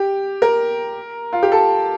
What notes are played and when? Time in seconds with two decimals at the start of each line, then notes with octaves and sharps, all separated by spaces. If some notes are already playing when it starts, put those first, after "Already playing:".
Already playing: G4
0.42 A#4
1.33 F4
1.43 G4
1.52 A4